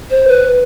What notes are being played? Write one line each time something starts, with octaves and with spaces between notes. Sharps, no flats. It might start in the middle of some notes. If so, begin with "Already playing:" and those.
C5
B4